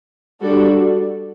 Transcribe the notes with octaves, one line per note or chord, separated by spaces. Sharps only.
G3 D4 F#4 A4